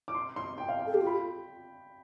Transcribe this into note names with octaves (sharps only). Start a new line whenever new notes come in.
D6
C6
C6
G5
F5
G5
A4
G4
F4
B5